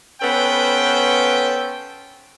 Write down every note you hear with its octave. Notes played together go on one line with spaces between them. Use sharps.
B3 C#4 A4 B4 C5 G5